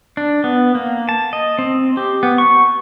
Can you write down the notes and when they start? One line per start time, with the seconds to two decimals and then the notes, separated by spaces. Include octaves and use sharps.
0.17 D4
0.44 B3
0.75 A#3
1.09 A5
1.33 D#5
1.59 C4
1.97 G4
2.23 B3
2.38 C#6